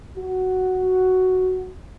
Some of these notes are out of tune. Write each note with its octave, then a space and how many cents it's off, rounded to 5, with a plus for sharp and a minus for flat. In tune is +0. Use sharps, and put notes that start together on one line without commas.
F#4 +5